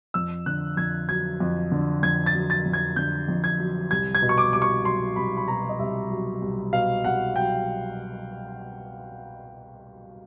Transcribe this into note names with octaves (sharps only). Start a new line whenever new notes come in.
F2 E6
D3 F#6
F2 G#6
F#3 G#6
F2
D3
F2 G#6
A6
F#3
A6
F2
G#6
D3 G6
F2
G#6
F#3
C2 G#6
G#6
B2
C#6
D6
C2 D6
C#6
F#3 C6
C2 B5
B5
B2 A#5
D#5
C2 E5
F#3
C2
B2 F5
C2 F#5
F#3 G5